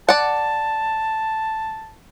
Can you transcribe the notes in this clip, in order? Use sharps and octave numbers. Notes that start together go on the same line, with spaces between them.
D5 F#5 A5